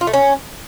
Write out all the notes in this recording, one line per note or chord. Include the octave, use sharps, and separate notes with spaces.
F4
A3
C#4